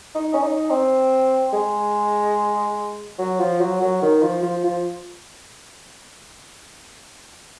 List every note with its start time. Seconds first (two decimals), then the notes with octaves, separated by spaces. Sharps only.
0.15 D#4
0.34 C#4
0.42 D#4
0.70 C4
1.53 G#3
3.19 F#3
3.40 F3
3.60 F#3
3.81 F#3
4.02 D#3
4.22 F3
4.43 F3
4.64 F3